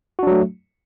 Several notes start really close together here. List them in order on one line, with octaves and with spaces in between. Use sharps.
F#4 D4 F#3 A3